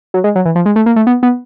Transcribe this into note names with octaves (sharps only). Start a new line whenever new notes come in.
F#3
G#3
F#3
E3
F3
G#3
A3
A#3
A3
B3
B3